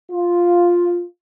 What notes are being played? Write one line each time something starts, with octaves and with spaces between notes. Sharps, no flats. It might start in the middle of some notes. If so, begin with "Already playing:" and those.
F4